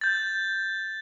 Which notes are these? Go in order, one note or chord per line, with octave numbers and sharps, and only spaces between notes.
G6 A6